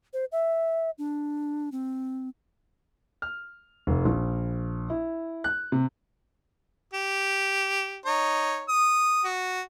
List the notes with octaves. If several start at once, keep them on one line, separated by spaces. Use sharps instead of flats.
C5
E5
D4
C4
F6
F1
A#1
E4
F#6
C3
G4
D#4 C#5
D#6
F#4